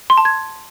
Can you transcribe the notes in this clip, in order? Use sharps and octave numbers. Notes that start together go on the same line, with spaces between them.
C6
A5
G#6